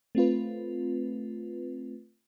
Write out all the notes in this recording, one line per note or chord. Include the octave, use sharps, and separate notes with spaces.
A3 C4 F4 B4